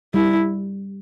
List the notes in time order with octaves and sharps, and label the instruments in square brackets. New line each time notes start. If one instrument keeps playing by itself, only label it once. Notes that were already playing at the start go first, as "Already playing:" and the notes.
[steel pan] G3 [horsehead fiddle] E4